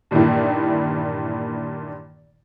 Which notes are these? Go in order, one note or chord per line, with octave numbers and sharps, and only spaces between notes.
G2 A#2 D#3 E3 A#3 E4